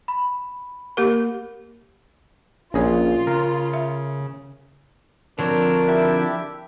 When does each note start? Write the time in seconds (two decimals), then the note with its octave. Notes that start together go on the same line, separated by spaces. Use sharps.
0.08 B5
0.97 A#3 G4 A#4
2.74 A#1 C#4 F4 G#4 C#5
3.27 C#3 A#4
3.73 E5
5.39 D3 F3 C4 D4 A#4 C#5
5.87 E4 G4 E5